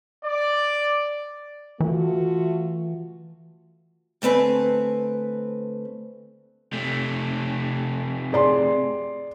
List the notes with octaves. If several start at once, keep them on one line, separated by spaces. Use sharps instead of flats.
D5
E3 A3 F4 F#4
D2 A3 C4 B4 G#5
C3 A3
G#4 D5 C6